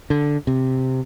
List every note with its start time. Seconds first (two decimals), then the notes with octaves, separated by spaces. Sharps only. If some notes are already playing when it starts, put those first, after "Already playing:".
0.10 D3
0.47 C3